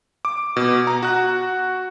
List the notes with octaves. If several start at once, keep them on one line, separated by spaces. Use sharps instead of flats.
D6
B2
A#5
F#4 F#6